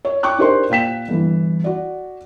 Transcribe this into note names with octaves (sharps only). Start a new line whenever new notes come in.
C#5
G5 C#6 D6 F#6
D4 D#4 G4 A#4 C5 C6
A#2 F5 G5 B6 E7
G1 E3
F#4 D5